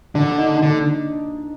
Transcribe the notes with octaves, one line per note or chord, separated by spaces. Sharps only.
D3 D4
D#4
D3 D4